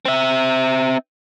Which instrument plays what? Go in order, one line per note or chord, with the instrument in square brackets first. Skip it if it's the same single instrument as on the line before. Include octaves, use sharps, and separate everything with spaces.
[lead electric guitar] C4 E5